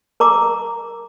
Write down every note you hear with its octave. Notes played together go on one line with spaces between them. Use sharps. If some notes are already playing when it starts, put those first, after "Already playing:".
A#4 A#5 D6